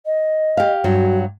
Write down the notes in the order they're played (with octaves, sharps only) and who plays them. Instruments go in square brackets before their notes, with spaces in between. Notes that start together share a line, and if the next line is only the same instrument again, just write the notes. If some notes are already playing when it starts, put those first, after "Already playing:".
[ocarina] D#5
[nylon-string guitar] G4 F5
[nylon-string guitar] G2 F#3 [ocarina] F#4